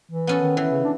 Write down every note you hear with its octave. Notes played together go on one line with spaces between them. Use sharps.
E3
B3 C#4 A4
D#3
E3
C#3
D4